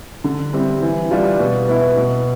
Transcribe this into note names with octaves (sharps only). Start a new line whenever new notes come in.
D3
G3 C4 E4
E3
G3 D4 F4
B2
B3 E4
B2